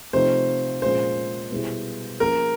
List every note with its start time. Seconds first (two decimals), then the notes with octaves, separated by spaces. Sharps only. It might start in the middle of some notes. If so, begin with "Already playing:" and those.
0.13 C3 F3 A3 C4 D#4 C5
0.82 A#2 F3 G#3 C#4 C5
1.51 B2 G3 B3 E4 G#4
2.20 F3 A#3 C#4 F4 G#4 A#4